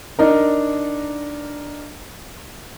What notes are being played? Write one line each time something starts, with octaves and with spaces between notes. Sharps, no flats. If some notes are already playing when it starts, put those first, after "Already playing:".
D4 D#4 A#4